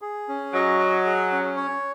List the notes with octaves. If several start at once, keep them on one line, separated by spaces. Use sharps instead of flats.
G#4
C#4
F#3 D#5
F#5
G#4
C#4
C#5